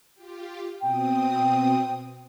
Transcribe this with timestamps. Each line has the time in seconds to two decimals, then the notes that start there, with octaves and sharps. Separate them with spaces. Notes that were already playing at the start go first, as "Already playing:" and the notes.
0.15 F4 G4
0.81 B2 C4 G5 D#6